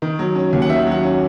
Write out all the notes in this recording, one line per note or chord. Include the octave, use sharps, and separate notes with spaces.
D#3
F#3
C#4
D#2
F#5
D#3 E5
F#3
F#5
C#4